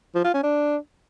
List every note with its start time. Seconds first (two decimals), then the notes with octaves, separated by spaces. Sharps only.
0.15 F3
0.24 F4
0.34 C#4
0.43 D4